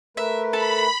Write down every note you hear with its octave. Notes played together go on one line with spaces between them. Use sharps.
A3 A#4 B4 E5
A4 A5 B5